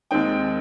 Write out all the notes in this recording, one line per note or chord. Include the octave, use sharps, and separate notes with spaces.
D#2 D#3 G#3 C4 D#4 G5